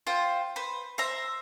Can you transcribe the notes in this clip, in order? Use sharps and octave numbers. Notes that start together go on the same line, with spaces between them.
F4 C5 G5
B4 C5
C5 E5 A#5